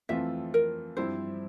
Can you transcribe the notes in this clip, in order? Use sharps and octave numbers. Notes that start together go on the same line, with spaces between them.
F2 E3 A3 C4 F4 E5
A#4
G2 F3 C4 E4 G4 C5